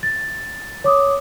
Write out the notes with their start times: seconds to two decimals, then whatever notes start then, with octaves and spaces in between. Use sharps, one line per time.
0.03 A6
0.84 C#5 D6 D#6